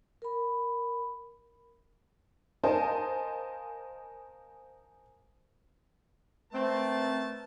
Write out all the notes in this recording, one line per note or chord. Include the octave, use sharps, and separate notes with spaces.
A#4 B5
A#4 C5 D#5 F5 G#5 A5
A3 C4 A#4 B4 A5